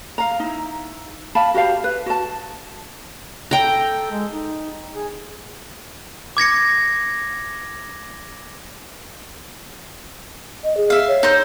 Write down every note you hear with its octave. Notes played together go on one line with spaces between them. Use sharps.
F5 A#5
D#4 E4
E5 F5 A5 B5
F#4 G4 C5 F5
B4
F#4 A5
A4 G5 A#5
G#3
D#4
G#4
D6 G#6 A#6 C#7
D#5
G#4
E5 F5
C#5
D#4 C5